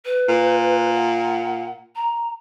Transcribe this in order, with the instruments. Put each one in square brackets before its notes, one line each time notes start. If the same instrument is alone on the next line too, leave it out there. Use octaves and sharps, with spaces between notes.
[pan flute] B4
[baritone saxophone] A#2
[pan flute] F#5
A#5